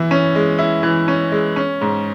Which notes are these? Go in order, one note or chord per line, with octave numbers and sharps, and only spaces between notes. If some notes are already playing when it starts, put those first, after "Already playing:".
Already playing: E3 E4
C#4
G#3
E4
E3
C#4
G#3
C#4
G#2